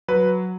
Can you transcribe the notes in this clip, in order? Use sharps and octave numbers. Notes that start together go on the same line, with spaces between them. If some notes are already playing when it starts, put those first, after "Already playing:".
F#3 B4